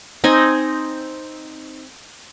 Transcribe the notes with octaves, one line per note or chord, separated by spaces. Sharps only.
C4 D#4 D#5 G#5